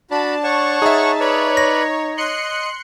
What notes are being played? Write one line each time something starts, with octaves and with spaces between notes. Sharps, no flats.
D4 F#4 A5 B5
C#5 F#5 C#6
D#4 G#4 E5
B4 C#5 D5
A#6
D#5 C6 F#6 C#7